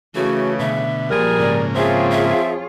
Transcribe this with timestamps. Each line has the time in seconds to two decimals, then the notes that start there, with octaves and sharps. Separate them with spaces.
0.15 C#3 E3 A3 F#4
0.59 B2 D3 E5
1.09 A#2 F3 G3 G#4 A#4
1.40 G#2 C#3 A#3 D5
1.75 F3 C4 F4 G#4 C#5 E5
2.11 E5